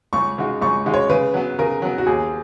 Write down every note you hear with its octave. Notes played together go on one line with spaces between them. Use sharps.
C#2 C#6
C#3 G#3 D#4 F#4
C#2 C#6
C#3 G#3 D#4 F#4
C#5
C#3 B4
F#3 B3
C#3 A#4
F#3 B3
F#4
D#2 G#4